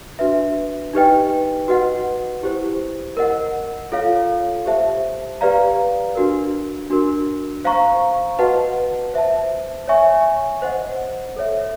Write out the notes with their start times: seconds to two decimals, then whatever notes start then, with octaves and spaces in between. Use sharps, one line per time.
0.19 D4 F#4 B4 E5
0.93 D#4 G4 B4 D#5 G5
1.68 F#4 B4 D#5 F#5
2.43 E4 G4 C5
3.17 A#4 D#5 F#5
3.92 F4 A4 C#5 F5
4.66 G4 C5 E5 A5
5.41 G4 B4 D5 F5 A#5
6.15 D4 F#4 A#4
6.90 D4 F#4 A#4
7.65 C5 F5 A#5 C#6
8.39 F#4 B4 D#5 F#5 A5
9.14 C5 E5 A5
9.88 C#5 E5 G#5 C#6
10.62 C5 D#5 F#5
11.36 A4 C#5 E5